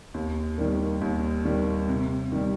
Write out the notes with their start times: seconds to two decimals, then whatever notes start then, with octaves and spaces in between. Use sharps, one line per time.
0.14 D#2
0.57 D#3 G3 A#3
1.01 D#2
1.45 D#3 G3 A#3
1.89 C3
2.32 D#3 G3